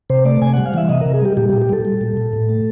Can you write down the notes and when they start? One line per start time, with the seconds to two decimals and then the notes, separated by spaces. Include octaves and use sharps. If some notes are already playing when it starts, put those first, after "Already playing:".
0.10 C3 C5
0.25 A3 D5
0.42 C3 G#5
0.53 G3 F#5
0.66 F5
0.74 E3 E5
0.89 C3 D#5
1.01 C3 A#4
1.14 G#4
1.21 G3 G4
1.37 A#2 G4
1.49 G4
1.53 A#2
1.62 G4
1.69 G3 A4
1.85 G3
2.01 A#2
2.17 A#2
2.33 A2
2.49 A3